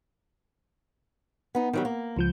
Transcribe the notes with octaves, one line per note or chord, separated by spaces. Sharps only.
B3 D#4
D#3 F#3 G3
A#3
C#2 F3 G6